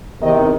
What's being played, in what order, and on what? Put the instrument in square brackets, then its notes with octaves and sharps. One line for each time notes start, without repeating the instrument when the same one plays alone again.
[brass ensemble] E2 C3 D#3 D#5